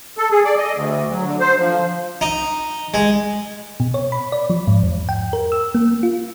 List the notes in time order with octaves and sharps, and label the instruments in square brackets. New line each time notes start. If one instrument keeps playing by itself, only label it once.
[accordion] A4
G#4
D5
D#5
D2
F#3
D3
C5
F3
[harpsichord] D#4
G#3
[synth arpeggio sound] B2
C#5
B5
D5
F3
G#2
E2
G5
A#4
E6
A#3
F4